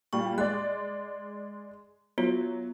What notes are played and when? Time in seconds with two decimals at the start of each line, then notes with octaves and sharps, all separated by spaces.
0.13 A#2 G3 C#6
0.38 G#3 D5 F#6
2.18 F#3 B3 F4